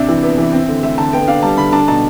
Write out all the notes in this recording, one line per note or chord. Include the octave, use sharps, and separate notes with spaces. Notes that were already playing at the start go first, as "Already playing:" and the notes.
Already playing: C3 D4 E5
E3
B3
E3
C4
D3
A3 E5
D3 A5
B3 G5
D4 F5
G3 A5
D3 B5
D4 A5
B2 A5